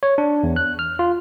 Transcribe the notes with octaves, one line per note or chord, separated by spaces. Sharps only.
C#5
D4
E2
F#6
F6
F4